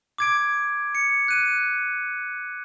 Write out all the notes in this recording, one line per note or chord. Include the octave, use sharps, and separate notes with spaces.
D6 G#6 D7
C#7
F#6 D#7